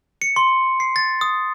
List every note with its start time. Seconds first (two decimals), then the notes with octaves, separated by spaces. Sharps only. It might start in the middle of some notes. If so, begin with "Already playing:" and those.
0.22 C#7
0.36 C6
0.80 C7
0.96 A6
1.21 D#6